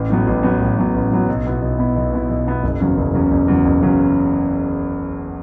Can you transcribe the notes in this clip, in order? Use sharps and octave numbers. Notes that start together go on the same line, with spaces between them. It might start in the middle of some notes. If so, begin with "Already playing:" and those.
Already playing: A1
A2 F#3 B3
A1
A2 F#3 B3
A1
A2 F#3 B3
A1
A2 F#3 B3
B1
B2 B3 E4
B1
B2 B3 E4
B1
B2 B3 E4
B1
B2 B3 E4
F#1
E2 C#3 F#3
F#1
E2 C#3 F#3
F#1
E2 C#3 F#3
F#1
E2 C#3 F#3